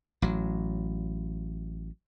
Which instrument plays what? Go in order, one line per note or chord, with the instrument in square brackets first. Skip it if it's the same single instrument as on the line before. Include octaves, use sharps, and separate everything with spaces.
[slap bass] A1 F#3